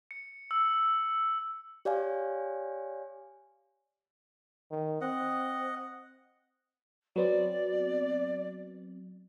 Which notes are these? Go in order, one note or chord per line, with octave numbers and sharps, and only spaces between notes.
C#7
E6
G4 C#5 D5 F5 G#5
D#3
C4 D#5 F#5
F#3 B3 C4 D5